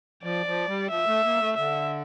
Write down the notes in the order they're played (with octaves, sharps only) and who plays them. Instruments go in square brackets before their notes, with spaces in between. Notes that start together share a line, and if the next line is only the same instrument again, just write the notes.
[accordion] F3 [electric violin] D5
[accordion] F3
G3
[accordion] F3 [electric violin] E5
[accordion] A3
A#3
A3
[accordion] D3 [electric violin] E5